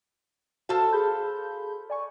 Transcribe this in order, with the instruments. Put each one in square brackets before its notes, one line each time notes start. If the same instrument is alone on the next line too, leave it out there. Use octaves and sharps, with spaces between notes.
[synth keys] F#4 [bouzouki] A4 C5 F5
[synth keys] G#4 B5 G6
D5 G#5 C#6